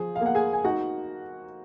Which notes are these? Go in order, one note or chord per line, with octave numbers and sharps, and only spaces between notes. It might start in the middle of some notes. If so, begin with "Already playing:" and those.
Already playing: F3 G#4
F5
A#3
F#5
G#4 G#5
G#5
D#4 F#4 F#5